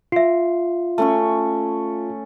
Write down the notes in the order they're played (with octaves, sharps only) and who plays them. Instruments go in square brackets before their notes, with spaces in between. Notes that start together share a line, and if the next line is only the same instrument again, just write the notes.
[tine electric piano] F4 [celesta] E5 C7
[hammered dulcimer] A3 C#4 C#6